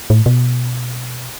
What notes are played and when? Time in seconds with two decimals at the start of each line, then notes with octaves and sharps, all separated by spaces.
0.10 A2
0.26 B2